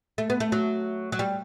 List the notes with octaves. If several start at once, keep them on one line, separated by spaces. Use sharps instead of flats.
A3
B3
A3
F#3
F#3
G3